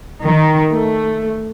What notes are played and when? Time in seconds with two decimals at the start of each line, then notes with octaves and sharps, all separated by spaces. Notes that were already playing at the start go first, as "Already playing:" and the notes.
0.21 D#3
0.73 A3